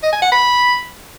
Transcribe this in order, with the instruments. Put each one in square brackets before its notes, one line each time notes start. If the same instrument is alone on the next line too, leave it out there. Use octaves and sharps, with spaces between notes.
[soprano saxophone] D#5
G#5
F#5
B5